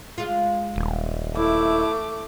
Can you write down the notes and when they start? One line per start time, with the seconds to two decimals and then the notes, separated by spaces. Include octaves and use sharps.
0.18 G#3 F4
0.76 D#1
1.36 E2 A3 E4 D6